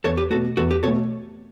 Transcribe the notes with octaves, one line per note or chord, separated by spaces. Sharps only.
E2 A4 C#5
G4 B4
B2 A3 F#4 A4
E2 F#4 A4
G4 B4
B2 A3 A4 C#5